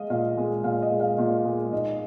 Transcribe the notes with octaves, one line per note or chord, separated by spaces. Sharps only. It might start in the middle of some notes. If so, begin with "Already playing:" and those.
Already playing: G#3 D#5 F5
A#2 F5
G#3
A#2 F5
D#5
G#3
F5
A#2 F5
G#3
G#2 D#5